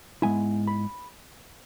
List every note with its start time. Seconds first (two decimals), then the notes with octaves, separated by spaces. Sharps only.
0.22 G#2 G#3 B3 E4 G#5
0.67 B5